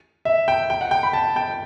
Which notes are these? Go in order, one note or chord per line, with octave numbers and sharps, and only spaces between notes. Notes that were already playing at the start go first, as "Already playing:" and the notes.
E5
G5
G5
F#5
G5
B5
A5
G5